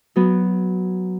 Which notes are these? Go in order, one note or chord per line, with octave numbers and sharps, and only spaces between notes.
F#3 B3